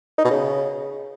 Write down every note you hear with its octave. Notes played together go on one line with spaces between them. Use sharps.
D#4
B2
C#3